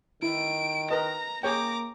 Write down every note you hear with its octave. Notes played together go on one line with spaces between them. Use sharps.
D#3 E4 D7
A#4 B4 D#5 A#5
A#3 G#4 C#5 G5 A#5 D6